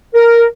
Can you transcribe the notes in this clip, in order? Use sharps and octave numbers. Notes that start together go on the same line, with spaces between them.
A#4